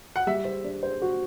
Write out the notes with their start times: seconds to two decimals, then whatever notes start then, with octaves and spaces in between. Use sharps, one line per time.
0.16 F#5
0.27 G3 E5
0.45 C5
0.64 D4
0.83 C5
1.02 F#4